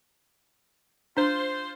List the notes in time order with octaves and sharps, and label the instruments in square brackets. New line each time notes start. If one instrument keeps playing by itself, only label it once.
[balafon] D4 [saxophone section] F4 C5